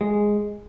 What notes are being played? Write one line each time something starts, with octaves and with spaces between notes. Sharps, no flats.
G#3